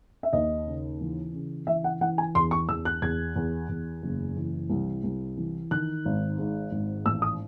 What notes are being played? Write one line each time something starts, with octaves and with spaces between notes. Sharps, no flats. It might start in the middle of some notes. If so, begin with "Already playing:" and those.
E5
D#2 D#5
C#3
E3
C#3
E3 E5
F#5
E3 F#5
G#5
E2 C6
C#6
E2 E6
F#6
E2 G#6
E2
E2
F#1
E3
C2
C2
E3
D#3 F#6
G#1
G#2
G#1
A1 E6
D#6